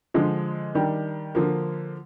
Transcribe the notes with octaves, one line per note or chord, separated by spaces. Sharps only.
D3 F3 G#3
D#3 G3 D4
D3 F3 A#3